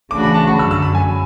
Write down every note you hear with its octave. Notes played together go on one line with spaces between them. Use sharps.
C#3 E3 A3 D4 F#4 D6
B5
A5
C#6
F#2 D3 F#3 E6
E6
B5
G#5